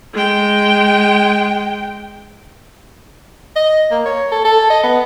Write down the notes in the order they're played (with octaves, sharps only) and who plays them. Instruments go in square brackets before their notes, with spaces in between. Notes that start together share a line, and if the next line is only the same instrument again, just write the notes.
[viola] G#3 G5
[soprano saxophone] D#5
A#3
C#5
A4
A4
D#5
B3